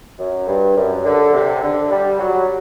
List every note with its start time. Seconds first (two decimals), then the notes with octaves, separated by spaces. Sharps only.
0.19 F#2
0.47 G2
0.76 F#2
1.05 D3
1.34 C3
1.63 D3
1.91 G3
2.20 F#3